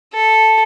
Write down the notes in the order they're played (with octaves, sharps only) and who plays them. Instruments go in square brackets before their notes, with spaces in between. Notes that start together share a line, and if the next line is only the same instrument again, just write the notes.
[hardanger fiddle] A4